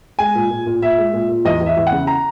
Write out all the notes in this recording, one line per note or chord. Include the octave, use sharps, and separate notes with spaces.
G#3 G#5
A#2
A#2
A#2
A#2 E5
G#3
A#2
A#2
E2 D#5
E2
E5
E2
F#5
C#3
A#5